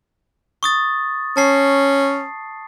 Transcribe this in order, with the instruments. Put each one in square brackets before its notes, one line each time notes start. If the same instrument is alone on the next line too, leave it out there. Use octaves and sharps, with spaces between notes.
[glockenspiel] C#6 D#6 A6
[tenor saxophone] C#4 [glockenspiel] A5 C7